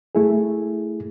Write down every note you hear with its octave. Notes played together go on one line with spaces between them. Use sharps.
A3 E4 G#4